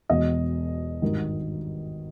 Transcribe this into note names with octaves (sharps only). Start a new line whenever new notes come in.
E1 E2 B2 D#5
G#1 G2 D#3